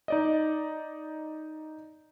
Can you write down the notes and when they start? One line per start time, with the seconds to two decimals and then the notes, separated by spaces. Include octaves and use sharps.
0.08 D#4 D5 D#5